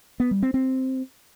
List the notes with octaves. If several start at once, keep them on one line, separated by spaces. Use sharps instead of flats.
B3
G3
C4
C4